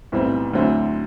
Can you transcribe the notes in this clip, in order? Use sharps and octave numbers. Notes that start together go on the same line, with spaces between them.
B1 A2 E3 G3 C4
D2 D3 F#3 C4 E4